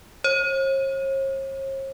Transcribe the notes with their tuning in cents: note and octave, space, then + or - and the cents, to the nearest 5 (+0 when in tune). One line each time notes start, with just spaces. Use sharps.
C#5 -45